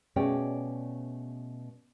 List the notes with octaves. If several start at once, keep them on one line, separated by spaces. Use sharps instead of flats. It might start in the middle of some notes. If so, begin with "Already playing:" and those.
B2 A3 C#4 G#4 D5 G5